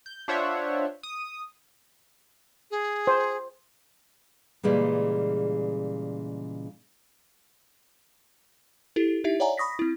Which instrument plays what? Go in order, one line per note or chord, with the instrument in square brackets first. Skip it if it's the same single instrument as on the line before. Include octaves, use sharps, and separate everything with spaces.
[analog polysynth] G6
D4 F4 C5 C#5 E5 F#5
D#6
[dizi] G#4
[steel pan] C5
[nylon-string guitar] A#2 C#3 E3 G3 G#3
[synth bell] E4 G4 A4
D#4 E4 G4 E5
C#5 D5 E5 F#5 G#5 A#5
B5 C#6 D#6 A#6 B6
C4 E4